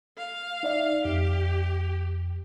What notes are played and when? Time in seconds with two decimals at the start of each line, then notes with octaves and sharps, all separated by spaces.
0.17 F5
0.63 D#4 D5 E5
1.05 F2 G4